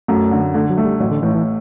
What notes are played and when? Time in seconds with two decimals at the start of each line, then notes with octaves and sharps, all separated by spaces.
0.08 F#2 A3
0.31 D3
0.54 D3 A3
0.70 F#3
0.77 A3
0.85 G3
1.00 A1 F#3
1.11 D3
1.23 A2 E3
1.35 E3